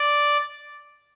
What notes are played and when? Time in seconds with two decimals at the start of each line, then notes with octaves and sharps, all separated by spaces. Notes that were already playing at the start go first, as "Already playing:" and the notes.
Already playing: D5